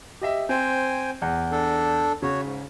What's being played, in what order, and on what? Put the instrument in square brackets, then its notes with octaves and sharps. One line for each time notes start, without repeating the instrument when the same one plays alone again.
[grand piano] G4 D#5 E5
[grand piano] C4 [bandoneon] C5 G5 G#5
[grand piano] E2
[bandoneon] D4 A4
[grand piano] C#3 [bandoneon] F#4 C#5
[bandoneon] G#2